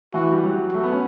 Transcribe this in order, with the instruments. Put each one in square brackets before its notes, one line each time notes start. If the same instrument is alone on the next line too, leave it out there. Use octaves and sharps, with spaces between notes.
[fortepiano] E3 [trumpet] F#4
[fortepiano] G3
F#3
[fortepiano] A3 [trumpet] F#4
[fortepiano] B3
C#4